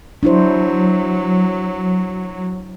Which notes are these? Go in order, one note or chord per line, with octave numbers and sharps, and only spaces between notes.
F#3 D4 E4 C5